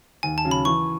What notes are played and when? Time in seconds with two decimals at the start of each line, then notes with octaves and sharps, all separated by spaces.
0.23 D#2 G#5
0.38 A5
0.45 C#3 F#3
0.51 B5
0.65 E3 C#6